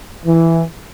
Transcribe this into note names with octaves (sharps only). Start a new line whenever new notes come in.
E3